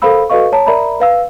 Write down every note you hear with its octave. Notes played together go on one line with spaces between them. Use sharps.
A4 A#4 C5 F5 B5 E6
F#4 A4 B4 D#5 F5 C#6
C#5 A5 A#5
A#4 D5 E5 A#5 B5
B4 F5 E6